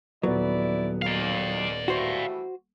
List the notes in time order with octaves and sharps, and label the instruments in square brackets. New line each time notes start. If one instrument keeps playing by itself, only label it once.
[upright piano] D#1 B3 [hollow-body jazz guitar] F#3 [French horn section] E4 D5
[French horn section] D#2 [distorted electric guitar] D5 F5
[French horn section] E3 G3 A3 [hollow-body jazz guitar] F#4 C5